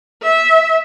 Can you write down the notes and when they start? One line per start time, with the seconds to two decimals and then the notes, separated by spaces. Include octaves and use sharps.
0.23 E5